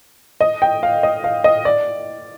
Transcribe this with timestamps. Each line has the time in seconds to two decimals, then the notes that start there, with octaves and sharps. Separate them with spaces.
0.41 D#5
0.62 G5
0.83 F5
1.03 D#5
1.24 F5
1.44 D#5
1.65 D5